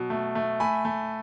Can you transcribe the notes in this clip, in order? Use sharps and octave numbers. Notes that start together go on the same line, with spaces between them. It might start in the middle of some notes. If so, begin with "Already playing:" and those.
Already playing: B2 F#3
A3
A3
A3 G#5 B5
A3